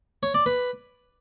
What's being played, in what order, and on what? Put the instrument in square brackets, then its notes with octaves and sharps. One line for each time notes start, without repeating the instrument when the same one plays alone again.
[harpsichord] C#5
D5
B4